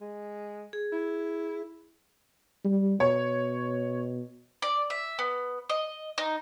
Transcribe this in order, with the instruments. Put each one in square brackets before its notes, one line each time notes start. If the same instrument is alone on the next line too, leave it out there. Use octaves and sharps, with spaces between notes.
[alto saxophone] G#3
[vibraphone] G#4
[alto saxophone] E4
[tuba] G3
[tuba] B2 [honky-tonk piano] C#5
[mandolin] D5
E5
B3
D#5
D#4